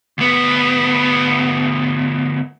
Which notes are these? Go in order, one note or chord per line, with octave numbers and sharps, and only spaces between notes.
D2 B3